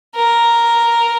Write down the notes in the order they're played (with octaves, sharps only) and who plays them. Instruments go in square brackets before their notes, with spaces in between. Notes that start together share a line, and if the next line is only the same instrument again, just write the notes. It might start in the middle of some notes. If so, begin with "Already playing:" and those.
[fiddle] A#4